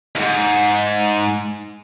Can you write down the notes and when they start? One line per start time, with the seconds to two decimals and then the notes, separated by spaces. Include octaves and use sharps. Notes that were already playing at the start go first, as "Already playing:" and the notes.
0.16 D#2 G#2